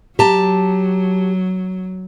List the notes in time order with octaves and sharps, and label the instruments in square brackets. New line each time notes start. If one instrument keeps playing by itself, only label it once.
[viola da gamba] F#3 [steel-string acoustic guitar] G4 A5 A#5